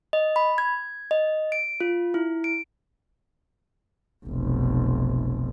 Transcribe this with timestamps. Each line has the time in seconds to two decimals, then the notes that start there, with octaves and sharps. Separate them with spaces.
0.13 D#5
0.36 B5
0.58 G#6
1.11 D#5
1.52 D7
1.81 F4
2.14 E4
2.44 D7
4.25 F1 B1